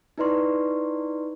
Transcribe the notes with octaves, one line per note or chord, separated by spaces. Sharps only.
D#4 E4 B4 D5 C6 C#6